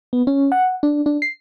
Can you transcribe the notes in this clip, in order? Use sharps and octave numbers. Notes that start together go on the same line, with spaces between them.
B3
C#4
F#5
D4
D4
C7